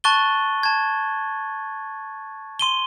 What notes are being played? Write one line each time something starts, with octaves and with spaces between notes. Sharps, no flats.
A5 C#6 F#6 A6 D#7 G7
A5 G#6
C6 D#7 G7